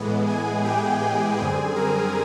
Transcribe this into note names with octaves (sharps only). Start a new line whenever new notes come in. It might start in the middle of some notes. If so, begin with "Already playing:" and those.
Already playing: A2 E3 G#3 B3
G#4 G#5
G4 G5
G#4 G#5
F#2 D3 G3 C4 G#4 G#5
A#4 A#5